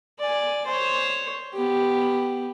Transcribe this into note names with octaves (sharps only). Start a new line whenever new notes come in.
D5 G#5
C5 C#5
B3 G4